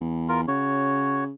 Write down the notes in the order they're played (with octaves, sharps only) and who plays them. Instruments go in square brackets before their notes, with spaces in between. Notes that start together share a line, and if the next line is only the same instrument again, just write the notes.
[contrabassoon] E2
[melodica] F4 A#4
[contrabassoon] C#3 [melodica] F#4 C#5